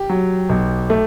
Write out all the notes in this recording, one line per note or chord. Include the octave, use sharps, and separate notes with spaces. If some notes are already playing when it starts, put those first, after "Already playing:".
Already playing: G4
F#3
B1
A3